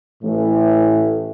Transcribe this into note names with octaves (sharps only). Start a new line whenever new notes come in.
A1 A2 E3 A3